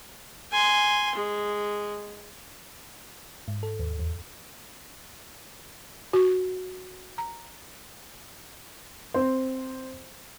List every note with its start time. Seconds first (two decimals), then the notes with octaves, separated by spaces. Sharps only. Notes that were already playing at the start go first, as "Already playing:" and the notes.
0.52 G#5 C6
1.15 G#3
3.48 G#2
3.63 A4
3.79 D#2
3.99 E2
6.13 F#4
7.18 A#5
9.14 C4 C5